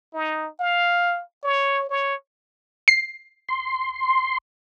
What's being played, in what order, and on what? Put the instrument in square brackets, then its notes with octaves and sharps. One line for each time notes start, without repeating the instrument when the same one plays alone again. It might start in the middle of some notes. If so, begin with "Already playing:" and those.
[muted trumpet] D#4
F5
C#5
C#5
[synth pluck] C7
[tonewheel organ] C6